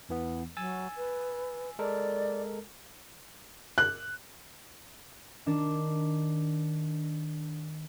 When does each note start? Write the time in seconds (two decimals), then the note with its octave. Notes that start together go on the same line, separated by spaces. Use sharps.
0.09 E2 E3 B3
0.57 F#3 G#5 E6 A6
0.96 B4
1.79 G#3 A4 A#4 D5
3.78 F#6
5.46 D#3 D4